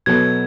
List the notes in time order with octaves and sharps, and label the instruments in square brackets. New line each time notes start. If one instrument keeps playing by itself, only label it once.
[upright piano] B2 F#3 B3 F#4 A4 [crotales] G#6